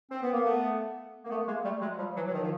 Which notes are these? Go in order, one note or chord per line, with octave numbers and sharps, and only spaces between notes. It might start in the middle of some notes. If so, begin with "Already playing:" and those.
C4
B3
A#3
A3 B3
A#3
A3 B3
G#3 A#3
G3 A3
F#3 G#3
F3 G3
E3 F#3
F#3
D#3 F3
F3